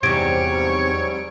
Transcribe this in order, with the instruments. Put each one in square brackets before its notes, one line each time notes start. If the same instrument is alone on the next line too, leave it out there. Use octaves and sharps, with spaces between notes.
[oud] E2 C3 [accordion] G#2 F#3 G3 [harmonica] C#5 [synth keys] G#6 D7